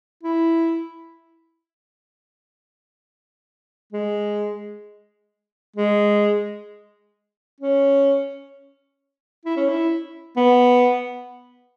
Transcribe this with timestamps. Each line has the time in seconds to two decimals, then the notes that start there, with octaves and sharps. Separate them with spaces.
0.23 E4
3.93 G#3
5.76 G#3
7.60 C#4
9.45 E4
9.57 C#4
9.69 E4
10.36 B3